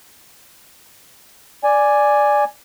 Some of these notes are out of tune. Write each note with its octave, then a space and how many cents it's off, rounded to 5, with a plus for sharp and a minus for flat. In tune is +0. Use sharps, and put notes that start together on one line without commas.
D5 +0 G#5 +0